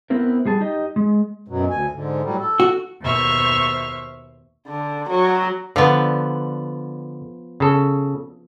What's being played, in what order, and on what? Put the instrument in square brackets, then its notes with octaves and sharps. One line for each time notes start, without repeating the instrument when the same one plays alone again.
[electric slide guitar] B3 C4 E4 A#4
G3 G#4 A5
D#4 G4 D#5
G#3
[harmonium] F#2 B2 F#3
D2 G#5
G#2 D3
A2 F#3 G3
A4
[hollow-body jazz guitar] F#4
[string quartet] D#2 B2 C5 E5 C#6 F6
[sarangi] D3
F#3
[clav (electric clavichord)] D3 [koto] F3 B3
[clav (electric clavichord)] C#3 A4